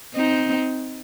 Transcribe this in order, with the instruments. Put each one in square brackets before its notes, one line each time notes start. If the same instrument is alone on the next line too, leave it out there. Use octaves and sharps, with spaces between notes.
[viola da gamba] C4 D#4